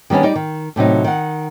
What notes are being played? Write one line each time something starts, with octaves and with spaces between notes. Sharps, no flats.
D#3 G3 B3 C#4 D4
G3 D#4 D5
D#3
A2 C3 F#3 D#4
D#3 F#5